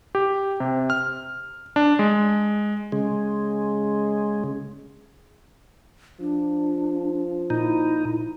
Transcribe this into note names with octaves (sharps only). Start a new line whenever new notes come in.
G4
C3
F6
D4
G#3
C#3 G#3
F3 D4
A#2 D#4 E4